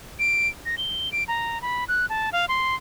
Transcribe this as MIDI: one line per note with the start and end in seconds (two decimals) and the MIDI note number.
0.19 0.48 98
0.66 0.75 94
0.78 1.12 103
1.12 1.24 98
1.28 1.61 82
1.62 1.84 83
1.88 2.06 90
2.09 2.32 81
2.32 2.45 77
2.48 2.75 84